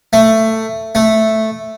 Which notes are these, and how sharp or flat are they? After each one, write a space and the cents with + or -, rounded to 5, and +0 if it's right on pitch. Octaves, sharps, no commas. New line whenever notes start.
A3 +15
A3 +0